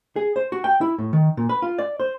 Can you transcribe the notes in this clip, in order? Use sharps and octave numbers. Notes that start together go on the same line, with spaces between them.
G#4
C5
F#4
G5
E4
A2
D#3
A#2
B4
F4
D5
C5